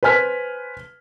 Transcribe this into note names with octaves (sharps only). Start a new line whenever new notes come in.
B4 C5 G#5 F6 B6